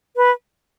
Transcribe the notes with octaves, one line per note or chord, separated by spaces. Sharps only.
B4